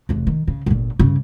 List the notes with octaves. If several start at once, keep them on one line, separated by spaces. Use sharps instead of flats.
F1 E2
D#3
C#3
G1 A#2
G2 C#3